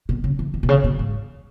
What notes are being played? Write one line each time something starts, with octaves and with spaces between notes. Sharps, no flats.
B2
C#3
E3
E3
B2
C#3
B2
G#2